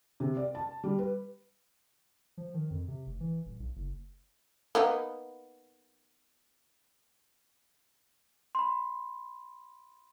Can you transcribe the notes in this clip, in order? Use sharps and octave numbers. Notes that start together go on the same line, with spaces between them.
C3
D5
A5
G3
B4
F3
D#3
F2
C3
F1
E3
D#1
B1
F#1
A#3 B3 D#4
B5 C6